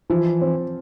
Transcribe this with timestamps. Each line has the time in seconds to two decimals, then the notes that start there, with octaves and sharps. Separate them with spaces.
0.10 E3 F3
0.41 C4